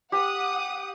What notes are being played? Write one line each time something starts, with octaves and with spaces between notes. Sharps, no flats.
G4 F#5 D#6